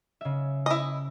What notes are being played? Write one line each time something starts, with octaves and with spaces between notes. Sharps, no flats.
C#3 E5
E4 D#5